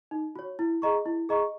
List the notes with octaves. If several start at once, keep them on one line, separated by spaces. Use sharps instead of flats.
D#4
F#4 C#5
E4
G#4 D#5 A#5 C#6
E4
G#4 D#5 A#5 C#6